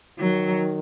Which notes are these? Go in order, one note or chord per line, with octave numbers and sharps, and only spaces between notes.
D#3 F#3